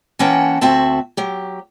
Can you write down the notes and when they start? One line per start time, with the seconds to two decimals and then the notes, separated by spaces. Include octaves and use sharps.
0.19 E3 A#3 C#4 F#5 G5 A5
0.61 D2 C4 F#4 E5 A5
1.17 F#3 G4